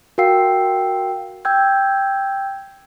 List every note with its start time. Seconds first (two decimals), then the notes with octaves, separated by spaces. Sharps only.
0.18 F#4 A#4 F5 G5 E6 C7
1.45 G5 E6 G6 G#6